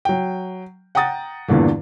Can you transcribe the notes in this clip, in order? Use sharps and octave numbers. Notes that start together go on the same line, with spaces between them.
F#3 G5
F#5 G5 A#5 D#6 A6
E2 G2 A#2 D3 E3